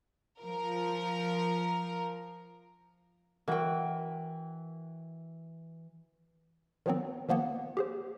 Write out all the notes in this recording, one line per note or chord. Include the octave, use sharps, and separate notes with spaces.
F3 A#4
E3 F#4 A#4 G5
D#3 F3 F#3 B3 C4
D#3 F3 A#3 B3
G4 G#4 C5